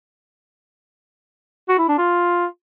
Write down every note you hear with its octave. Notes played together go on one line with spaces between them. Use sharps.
F#4
E4
D4
F4